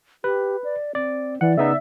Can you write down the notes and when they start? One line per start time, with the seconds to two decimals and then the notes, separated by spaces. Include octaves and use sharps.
0.24 G4 B4
0.64 D5
0.95 C4 D5
1.41 E3 D5 F#5
1.58 C#3 B3 D#4 E5